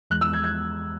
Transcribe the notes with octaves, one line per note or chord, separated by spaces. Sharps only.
E2 E3 G#3 F#6
E6
G#6
G#6